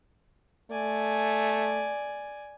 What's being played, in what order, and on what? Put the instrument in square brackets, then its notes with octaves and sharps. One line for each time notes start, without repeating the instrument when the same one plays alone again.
[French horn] A3 [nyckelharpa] D5 G#5